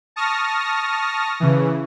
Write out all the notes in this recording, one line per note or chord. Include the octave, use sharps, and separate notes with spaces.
A5 C#6 D#6 F6 A#6
C#3 E3